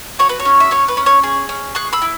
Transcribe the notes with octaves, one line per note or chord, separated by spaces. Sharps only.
F#4 C#5
B4
C#5
C#4
E5
C#4 C#5
B4
C#4
C#5
G#4
C#4
G#4 C#6 F#6
B5 E6
E4